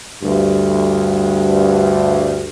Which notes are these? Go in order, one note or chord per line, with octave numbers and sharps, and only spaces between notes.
D2 G2